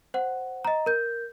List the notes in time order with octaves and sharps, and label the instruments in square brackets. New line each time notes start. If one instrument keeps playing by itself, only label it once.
[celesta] C5 F#5
D#5 A#5
A#4 G6